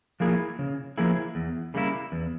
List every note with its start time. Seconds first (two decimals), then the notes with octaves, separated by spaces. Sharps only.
0.20 F3 A#3 E4 G#4
0.59 C#3
0.98 F3 A#3 E4 G#4
1.35 E2
1.74 C#3 G3 A#3 E4
2.12 E2